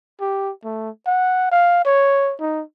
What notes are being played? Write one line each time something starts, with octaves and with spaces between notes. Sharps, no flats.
G4
A3
F#5
F5
C#5
D#4